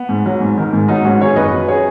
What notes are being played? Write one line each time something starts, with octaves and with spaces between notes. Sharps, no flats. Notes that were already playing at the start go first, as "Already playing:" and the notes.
Already playing: B3
G#2
F#3
G#2
D#3
G#2
F#3 B3 D#4
G#2 C#4 F#4
D#3 G#4 C#5
F#2 B4 D#5
F#3
G#4 C#5